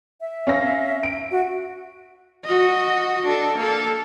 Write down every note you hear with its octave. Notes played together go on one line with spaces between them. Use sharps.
E5
C#4 F5 A#6
D7
F#4
F#4 D#5
D4 A4
A#3 A4